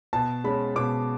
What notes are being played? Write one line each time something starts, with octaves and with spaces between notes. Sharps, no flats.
B2 A5
G#3 C#4 B5
B2 D6